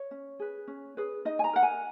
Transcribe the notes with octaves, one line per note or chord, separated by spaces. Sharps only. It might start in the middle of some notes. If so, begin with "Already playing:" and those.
Already playing: C#5
C#4
G#4 B4
C#4
G#4 B4
D#4 D#5
G#5
A#5
A#4 F#5
G#5